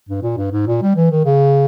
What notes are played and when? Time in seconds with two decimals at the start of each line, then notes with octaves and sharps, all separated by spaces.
0.09 G2
0.23 A#2
0.38 G2
0.52 G#2
0.67 A#2
0.82 G3
0.96 E3
1.11 D#3
1.25 C#3